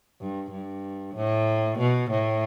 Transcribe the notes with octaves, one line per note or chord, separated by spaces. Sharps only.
G2
G2
A2
B2
A2